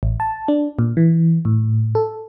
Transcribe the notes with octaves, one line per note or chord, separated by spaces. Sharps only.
A1
A5
D4
A#2
E3
A2
A4